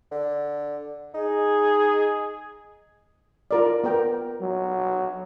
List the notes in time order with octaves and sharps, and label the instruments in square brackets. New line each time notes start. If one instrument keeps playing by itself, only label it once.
[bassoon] D3
[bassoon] D#4 [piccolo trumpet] G#4
[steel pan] F4 A#4 D5
B3 A#4 G5
[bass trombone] F#3